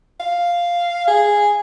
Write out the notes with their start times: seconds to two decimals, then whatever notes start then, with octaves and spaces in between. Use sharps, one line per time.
0.20 F5
1.07 G#4